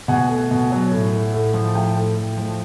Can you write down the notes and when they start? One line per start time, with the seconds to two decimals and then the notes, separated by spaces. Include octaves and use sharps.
0.08 B2 F#5 G#5
0.29 A3
0.51 B2
0.72 F#3
0.91 A2
1.13 A3
1.34 A2
1.54 F3
1.75 A2 G5 A5
1.96 A3
2.17 A2
2.37 F3